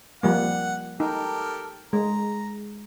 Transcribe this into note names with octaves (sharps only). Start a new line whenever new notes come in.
F3 G3 A#3 F#5
D#4 G4 A4 A#4
G#3 A#5